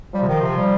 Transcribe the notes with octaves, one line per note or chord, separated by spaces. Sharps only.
F3 G3
C3
D#3
C3
G3